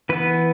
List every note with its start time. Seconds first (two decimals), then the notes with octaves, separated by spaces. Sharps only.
0.09 E3 B3 B4